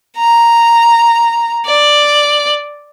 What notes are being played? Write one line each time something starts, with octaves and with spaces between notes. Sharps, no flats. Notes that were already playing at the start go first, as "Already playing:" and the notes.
A#5
D5